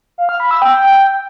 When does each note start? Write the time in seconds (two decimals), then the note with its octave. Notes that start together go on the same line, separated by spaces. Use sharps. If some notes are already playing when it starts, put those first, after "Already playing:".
0.18 F5
0.29 F6
0.40 B5
0.51 E6
0.62 G5